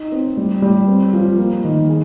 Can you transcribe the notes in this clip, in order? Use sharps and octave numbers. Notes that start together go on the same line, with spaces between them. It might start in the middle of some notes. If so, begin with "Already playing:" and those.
Already playing: D#4
C4
G3
G3
C4
F3
A#3
D#3
G#4